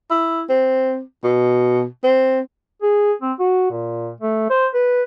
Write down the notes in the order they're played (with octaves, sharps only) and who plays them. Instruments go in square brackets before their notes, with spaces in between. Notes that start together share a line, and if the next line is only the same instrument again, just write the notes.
[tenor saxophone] E4
C4
B2
C4
[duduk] G#4
C4
F#4
A#2
A3
C5
B4